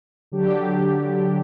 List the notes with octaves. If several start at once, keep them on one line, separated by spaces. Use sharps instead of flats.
D3 F#3 D4 G4